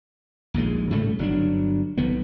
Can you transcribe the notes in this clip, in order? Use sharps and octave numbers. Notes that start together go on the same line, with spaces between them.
A#1 D#2 A#2 G#3
G#2 C#3 G3 A3
G1 F#3 C4 D4
B1 D#3 B3